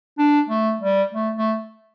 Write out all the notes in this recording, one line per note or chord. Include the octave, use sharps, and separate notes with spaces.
D4
A3
G3
A3
A3